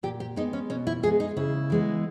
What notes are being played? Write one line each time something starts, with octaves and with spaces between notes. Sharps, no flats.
A#2 G4
G4
G#3 B3 D#4
C#4
B2 C#4
E4
G#3 B3 G#4
D#4
C#3 E4
E3 G#3 B3